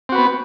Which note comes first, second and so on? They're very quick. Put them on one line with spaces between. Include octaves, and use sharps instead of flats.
C4 F#4 B4 B3